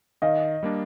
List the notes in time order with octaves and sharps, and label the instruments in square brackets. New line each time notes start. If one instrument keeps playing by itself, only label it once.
[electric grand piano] D#3 [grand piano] D#5 F5
[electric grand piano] G3 A#3 D4